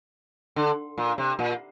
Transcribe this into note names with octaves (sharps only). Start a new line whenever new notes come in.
D3
A#2
C3
A#2